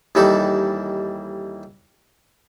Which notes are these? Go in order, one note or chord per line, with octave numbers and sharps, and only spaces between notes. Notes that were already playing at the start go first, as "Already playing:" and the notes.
D#2 E3 G3 D#4 A4 B5